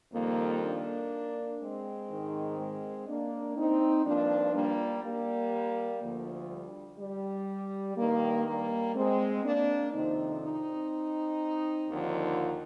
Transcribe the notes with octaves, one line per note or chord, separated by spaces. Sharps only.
F2 D#3 G3 A#3
A#3 D4
G#3 C4
G#2 D#3
G#3 C4
A#3 D4
C4 D#4
G2 F3 A#3 D4
G3 A#3
G3 A#3
D2 D3 F3
G3
G3
G2 D#3 G3 A#3
G3 A#3
G#3 C4
A#3 D4
F2 C3 D#3 C4 D#4
C4 D#4
D#2 D3 F3